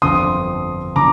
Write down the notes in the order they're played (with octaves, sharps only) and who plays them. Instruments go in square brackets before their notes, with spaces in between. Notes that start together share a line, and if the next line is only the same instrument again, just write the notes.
[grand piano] G1 F2 D3 F3 C6 D#6
D3 F3 A#5 D6